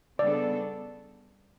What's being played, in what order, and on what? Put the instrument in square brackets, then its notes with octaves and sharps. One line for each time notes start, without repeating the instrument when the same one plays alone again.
[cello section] C#3 G3 B3 D4 A4 [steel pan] D5